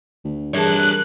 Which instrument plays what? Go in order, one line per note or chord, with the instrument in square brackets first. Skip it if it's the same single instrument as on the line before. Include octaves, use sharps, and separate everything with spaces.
[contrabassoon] D2
[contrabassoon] G2 [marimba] E3 G#4 A5 [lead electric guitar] A#4 C#5 [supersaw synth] F#6